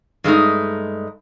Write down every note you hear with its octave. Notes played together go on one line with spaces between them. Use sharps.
G2 G#3 A3 D#4